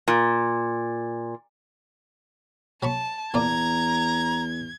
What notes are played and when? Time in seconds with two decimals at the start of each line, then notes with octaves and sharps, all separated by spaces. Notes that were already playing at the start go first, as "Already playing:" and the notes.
0.08 A#2
2.83 F#3 A5 B5 C#6
3.34 E2 A#2 F4 D5 A#5 G#6